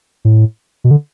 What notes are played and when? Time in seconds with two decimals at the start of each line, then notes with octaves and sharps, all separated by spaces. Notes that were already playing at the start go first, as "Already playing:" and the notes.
0.25 A2
0.84 B2
0.91 D3